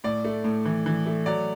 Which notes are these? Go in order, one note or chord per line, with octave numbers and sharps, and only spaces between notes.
A2 D5
A3
A2
E3
E3
A3
F#3 D5